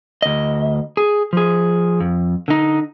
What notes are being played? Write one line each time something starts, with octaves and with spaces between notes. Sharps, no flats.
D2 D#5
G#4
F3 G#4
F2
D3 D#4